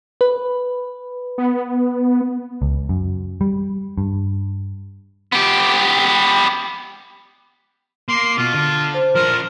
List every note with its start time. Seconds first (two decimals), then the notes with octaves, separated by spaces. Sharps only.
0.21 B4
1.38 B3
2.62 C#2
2.89 F#2
3.41 G3
3.98 G2
5.32 B3 G4
8.08 A#3 C6
8.37 B2 F4
8.53 D3
8.94 C5
9.15 F3 D4 A#4